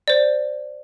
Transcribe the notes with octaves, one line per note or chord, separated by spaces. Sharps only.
C5 D5